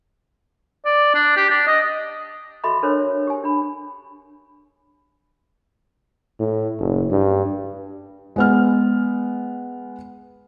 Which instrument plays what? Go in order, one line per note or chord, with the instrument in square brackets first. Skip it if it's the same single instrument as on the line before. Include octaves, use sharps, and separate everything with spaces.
[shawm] D5
D4
G4
D4
D#5
[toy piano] F#4 A4 D#5 E5 B5 C6
D4 A4 A#4 C5 C#5
C#5
G4 G#5
D4 B5
[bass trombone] A2
F#1
G2
[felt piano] G#3 B3 F6